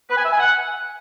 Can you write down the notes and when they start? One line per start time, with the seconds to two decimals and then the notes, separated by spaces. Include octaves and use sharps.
0.10 B4
0.17 G#5
0.25 E5
0.32 G#5
0.40 F#5